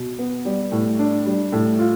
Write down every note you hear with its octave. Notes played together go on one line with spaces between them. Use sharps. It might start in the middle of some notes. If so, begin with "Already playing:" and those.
Already playing: B2
B3
G3
A2
D4
G3
A2
F4